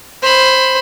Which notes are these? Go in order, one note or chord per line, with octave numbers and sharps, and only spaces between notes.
C5 B5